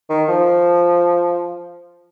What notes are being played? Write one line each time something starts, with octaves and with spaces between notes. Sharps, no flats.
D#3
F3